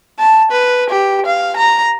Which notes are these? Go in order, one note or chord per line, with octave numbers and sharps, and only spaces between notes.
A5
B4
G4
F5
A#5